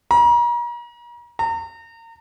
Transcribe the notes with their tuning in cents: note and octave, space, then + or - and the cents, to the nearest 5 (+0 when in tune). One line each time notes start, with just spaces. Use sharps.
A#5 +40
A#5 -35